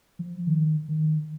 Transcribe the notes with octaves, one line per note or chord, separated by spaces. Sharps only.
F3
D#3
D#3